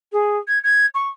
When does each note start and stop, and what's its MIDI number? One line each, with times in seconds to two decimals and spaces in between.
0.12 0.37 68
0.48 0.59 92
0.64 0.86 92
0.94 1.09 85